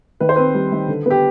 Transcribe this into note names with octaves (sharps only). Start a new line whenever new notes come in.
D#3 B4
C5
C4 B4
G3
D#3
D3
B3 G4